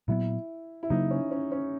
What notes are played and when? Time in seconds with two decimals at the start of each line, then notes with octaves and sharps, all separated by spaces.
0.08 A#2 F#3 B3 E4
0.83 E4
0.90 C#3 F#3 A#3 D#4
1.11 C#4
1.31 C#4
1.52 C#4